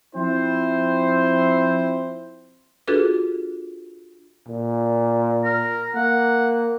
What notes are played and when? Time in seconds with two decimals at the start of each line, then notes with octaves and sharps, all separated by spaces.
0.15 F3 C4 E4 C5
2.88 D4 F4 F#4 G#4 A4 B4
4.48 A#2
5.44 A#4
5.95 A#3 F#5